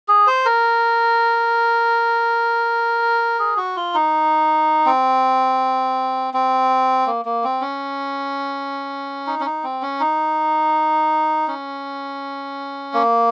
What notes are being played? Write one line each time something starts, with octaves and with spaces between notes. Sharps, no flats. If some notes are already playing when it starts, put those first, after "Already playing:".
G#4
C5
A#4
G#4
F#4
F4
D#4
C4
C4
A#3
A#3
C4
C#4
D#4
C#4
D#4
C4
C#4
D#4
C#4
A#3